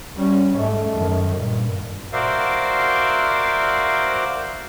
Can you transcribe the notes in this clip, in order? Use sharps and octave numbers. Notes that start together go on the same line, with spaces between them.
G3 C#4
G#2 A3
F#2 D#3
G2 A#2
F#4 A#4 C5 D5 E5 F5